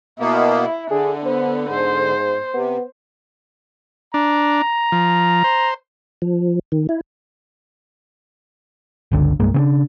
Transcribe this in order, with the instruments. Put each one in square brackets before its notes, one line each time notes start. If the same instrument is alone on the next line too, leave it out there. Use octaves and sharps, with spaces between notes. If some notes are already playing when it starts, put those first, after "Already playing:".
[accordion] B2 A#3 B3 [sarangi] E4
[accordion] D3 [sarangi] D4 [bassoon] G#4
[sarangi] B3 [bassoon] C5
[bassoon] G#2 [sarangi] C5
[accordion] C3 [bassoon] B3
[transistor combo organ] D4 [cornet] A#5
[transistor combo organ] F3
C5
[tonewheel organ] F3
D#3
E4
[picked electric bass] G1 C#2 D3
C2 G2 G#3 A#3
C#3 C4 D4